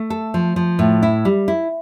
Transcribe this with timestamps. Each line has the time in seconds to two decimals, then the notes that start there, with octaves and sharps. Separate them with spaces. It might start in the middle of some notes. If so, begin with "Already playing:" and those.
Already playing: A3
0.10 A4
0.34 F3
0.56 F3
0.79 A2
1.03 E4
1.25 G3
1.48 E4